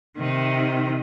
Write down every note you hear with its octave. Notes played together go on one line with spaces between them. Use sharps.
C3 D#3